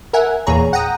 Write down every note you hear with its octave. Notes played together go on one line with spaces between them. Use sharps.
A#4 E5 F#5 G#5
E2 A#2 E3 G#4 C#5 A#5
F#5 G5 A#5 D#6